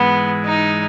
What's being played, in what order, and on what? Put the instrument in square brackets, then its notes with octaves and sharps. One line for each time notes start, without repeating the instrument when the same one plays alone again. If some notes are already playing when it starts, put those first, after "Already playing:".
Already playing: [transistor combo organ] G#2 E3 G#3 [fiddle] B3
[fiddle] D#4